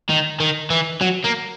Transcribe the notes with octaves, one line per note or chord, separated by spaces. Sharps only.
D#3
D#3
E3
F#3
A#3